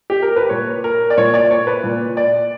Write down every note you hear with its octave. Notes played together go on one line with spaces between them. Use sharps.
G4
A#4
B4
A#2 C#5
A#4
D5
A#2 C#5
D5
C#5
B4
A#2
D5